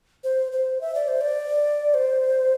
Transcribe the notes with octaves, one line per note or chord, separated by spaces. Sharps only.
C5
C5
E5
D5
C5
D5
C5